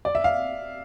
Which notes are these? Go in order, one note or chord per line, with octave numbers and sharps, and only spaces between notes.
D5
E5
F5